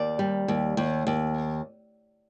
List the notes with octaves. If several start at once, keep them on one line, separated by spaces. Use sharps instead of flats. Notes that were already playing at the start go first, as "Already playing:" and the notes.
Already playing: D#2 D5
G3
D#2
D#2
D#2